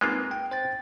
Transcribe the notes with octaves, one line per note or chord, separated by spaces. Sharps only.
G#3 A#3 C4 D#4 F4 B4
G5
C5 G5 A6